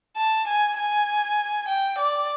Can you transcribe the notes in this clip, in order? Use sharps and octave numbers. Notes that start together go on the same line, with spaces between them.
A5
G#5
G#5
G5
D5